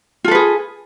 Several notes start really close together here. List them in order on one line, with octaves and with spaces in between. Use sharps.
F4 A4 B4 G#4